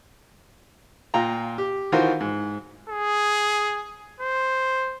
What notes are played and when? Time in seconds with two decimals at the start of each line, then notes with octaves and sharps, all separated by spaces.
1.14 A#2 F4 G5 A#5
1.58 G4
1.92 D#3 E3 F4 F#4 A#4 C5
2.20 G#2
2.89 G#4
4.20 C5